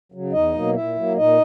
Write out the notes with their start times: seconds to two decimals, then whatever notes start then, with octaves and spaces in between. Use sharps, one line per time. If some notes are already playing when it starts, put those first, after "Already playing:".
0.12 C#3 F#3
0.32 E2 D#4 D#5
0.54 B2 F#3 A#3
0.75 A#2 E4 E5
0.96 F#3 A#3
1.16 A#2 D#4 D#5